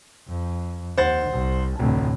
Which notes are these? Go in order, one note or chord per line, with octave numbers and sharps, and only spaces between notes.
F2
D#2 C5 F#5 A6
C2
F1 D2 A2